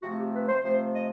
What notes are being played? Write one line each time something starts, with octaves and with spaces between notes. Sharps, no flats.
C3 F3 A3 C4 F#4
G4
B4
C5
C3 F3 A3 C4 C5
D#5